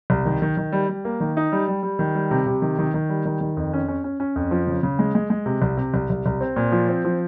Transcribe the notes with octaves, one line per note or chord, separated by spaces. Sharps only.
C2
D#3
D#3
D#3
G3
G3
A#3
D#3
D#4
G3
G3
G3
D#3
G3
C3
C3
D#3
D#3
D#3
G3
D#3
D#3
F2
C#4
C#4
C#4
C#4
F2
F3
C#3
C#3
G#3
G#3
G#3
C3
C2
C3
C2
C2
C2
C4
A#2
F3
C4
F3